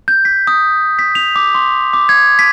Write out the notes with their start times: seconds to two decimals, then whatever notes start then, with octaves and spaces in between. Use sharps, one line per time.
0.08 G6
0.25 B6
0.47 D#6
0.99 B6
1.15 F7
1.36 D6
1.55 C6
1.93 D6
2.09 G#6
2.39 B6